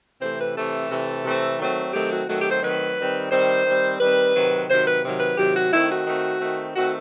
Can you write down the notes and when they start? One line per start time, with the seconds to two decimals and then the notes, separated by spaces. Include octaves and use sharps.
0.21 C3 E3 A3 C4 C5
0.38 B4
0.56 C3 E3 A3 C4 A4
0.90 C3 E3 A3 C4
1.25 C3 E3 A3 C4
1.59 D#3 F#3 A3 C4
1.93 D#3 F#3 A3 C4 G4
2.11 F#4
2.28 D#3 F#3 A3 C4 F#4
2.40 G4
2.51 C5
2.62 D#3 F#3 A3 C4 B4
2.97 D#3 G3 C4
3.31 D#3 G3 C4 C5
3.66 D#3 G3 C4
3.99 D#3 G3 C4 B4
4.35 C3 D#3 F#3
4.69 C3 D#3 F#3 C5
4.86 B4
5.03 C3 D#3 F#3
5.20 B4
5.37 C3 D#3 F#3 G4
5.54 F#4
5.73 D#3 A3 C4 E4
5.90 F#4
6.06 D#3 A3 C4
6.40 D#3 A3 C4
6.75 D#3 A3 C4 F#4